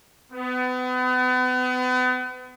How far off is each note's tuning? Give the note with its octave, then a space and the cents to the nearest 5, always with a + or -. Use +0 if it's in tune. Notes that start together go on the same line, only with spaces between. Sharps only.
B3 +35